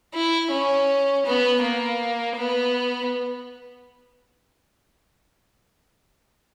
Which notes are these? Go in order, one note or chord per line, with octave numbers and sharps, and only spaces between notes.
E4
C#4
B3
A#3
B3